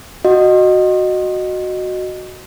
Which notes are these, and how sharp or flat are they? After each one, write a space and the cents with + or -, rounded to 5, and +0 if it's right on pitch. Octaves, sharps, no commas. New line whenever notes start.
F#4 +0 D#5 -15